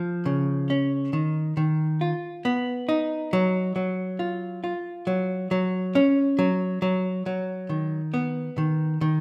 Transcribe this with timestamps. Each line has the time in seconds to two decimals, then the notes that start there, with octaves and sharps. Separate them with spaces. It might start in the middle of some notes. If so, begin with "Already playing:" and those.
Already playing: F3
0.26 C#3
0.70 C#4
1.13 D#3
1.57 D#3
2.01 F4
2.45 B3
2.89 D#4
3.33 F#3
3.76 F#3
4.19 F4
4.64 F4
5.07 F#3
5.51 F#3
5.95 C#4
6.39 F#3
6.82 F#3
7.26 F#3
7.69 D#3
8.14 B3
8.58 D#3
9.01 D#3